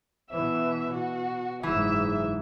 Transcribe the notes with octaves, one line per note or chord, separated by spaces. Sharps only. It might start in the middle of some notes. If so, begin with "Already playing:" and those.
B2 E3 E5
B2 F#4
F#1 G#2 E3 E5